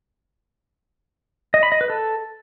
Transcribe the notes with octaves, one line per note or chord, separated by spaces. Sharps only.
D#5
B5
D#5
B4
A4